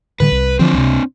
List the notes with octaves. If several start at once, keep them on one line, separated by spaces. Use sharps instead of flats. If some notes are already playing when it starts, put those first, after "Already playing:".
A2 D3 G3 B4
C2
D3 E3 F3 C4 D4
C#2 C3